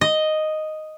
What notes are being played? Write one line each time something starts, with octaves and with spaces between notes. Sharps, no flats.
D#5